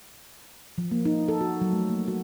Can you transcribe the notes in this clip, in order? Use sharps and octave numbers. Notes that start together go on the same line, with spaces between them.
F3
A#3
D#4
A4
F#4
F#3
A3
A#3
F#4